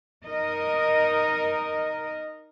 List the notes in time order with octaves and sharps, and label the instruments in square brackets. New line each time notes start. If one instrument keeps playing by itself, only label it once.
[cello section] D#4 A#4 D#5